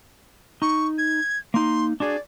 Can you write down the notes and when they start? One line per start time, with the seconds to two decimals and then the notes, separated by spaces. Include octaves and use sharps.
0.62 D#4 C#6
0.98 G#6
1.54 A#3 D#4 C6
2.00 D4 F#4 G#4 D5